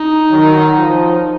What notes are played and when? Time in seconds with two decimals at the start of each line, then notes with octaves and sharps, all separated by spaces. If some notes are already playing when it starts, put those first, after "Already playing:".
Already playing: D#4
0.31 D#3 F#3
0.77 F3